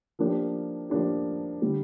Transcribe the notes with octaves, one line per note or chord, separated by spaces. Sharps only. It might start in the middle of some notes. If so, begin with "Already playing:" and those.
F3 A#3 D4 G4
F3 A#3 D4 G4
D3 G3